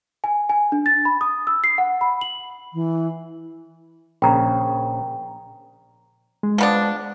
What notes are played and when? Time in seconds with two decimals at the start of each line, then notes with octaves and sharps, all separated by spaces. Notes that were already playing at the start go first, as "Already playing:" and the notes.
0.24 G#5
0.49 G#5
0.72 D4
0.86 A6
1.05 B5
1.21 D#6
1.47 E6
1.64 C7
1.78 F#5
2.01 B5
2.21 F#7
2.73 E3
4.22 A#1 C#3 G5 A#5
6.43 G#3
6.58 F3 B3 D4